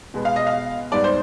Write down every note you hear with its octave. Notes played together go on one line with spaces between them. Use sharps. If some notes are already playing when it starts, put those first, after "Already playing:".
B2 G#3 B3
F5
D#5
F5
G#2 G3 B3 D5
C5